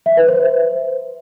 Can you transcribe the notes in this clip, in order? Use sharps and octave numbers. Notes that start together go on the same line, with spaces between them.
E5
B4
C5